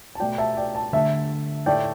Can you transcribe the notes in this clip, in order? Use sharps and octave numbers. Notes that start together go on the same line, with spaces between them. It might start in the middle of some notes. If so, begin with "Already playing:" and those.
A5
B2 A3 D5 G5
E5 A5
D5 G5
A5
D3 A3 E5 A5
A2 A3 D5 G5